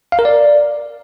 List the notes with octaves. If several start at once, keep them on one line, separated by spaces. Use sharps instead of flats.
F5
A#4
D5